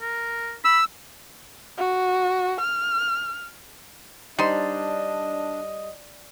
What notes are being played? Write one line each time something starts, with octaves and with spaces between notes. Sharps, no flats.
A#4
B5 E6
F#4
F6
G3 D4 D#4 C5 D#5 C6